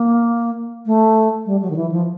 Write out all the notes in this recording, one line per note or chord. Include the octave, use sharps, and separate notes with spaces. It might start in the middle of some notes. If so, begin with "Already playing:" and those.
Already playing: A#3
A3
G3
F#3
D#3
E3
F3